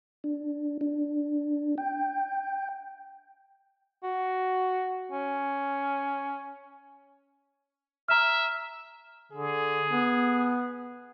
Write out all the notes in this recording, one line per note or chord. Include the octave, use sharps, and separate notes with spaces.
D4
D4
G5
F#4
C#4
E5 A#5 F6
D3 G#4
B3